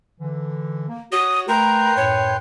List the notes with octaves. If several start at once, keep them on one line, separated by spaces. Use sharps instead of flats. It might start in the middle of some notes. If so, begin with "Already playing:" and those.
D3 E3
A#3
F#4 C#5 D#6
A3 A#4 B4 G5 A#5 C6
F#2 A2 C#5